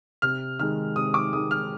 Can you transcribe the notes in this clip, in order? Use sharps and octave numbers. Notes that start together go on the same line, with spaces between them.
C3 F6
D#3 G#3 F6
C3 D#6
D6
D#3 G#3 D#6
F6